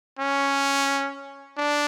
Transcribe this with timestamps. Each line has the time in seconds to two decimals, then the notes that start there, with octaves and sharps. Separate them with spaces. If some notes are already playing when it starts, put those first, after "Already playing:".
0.19 C#4
1.57 D4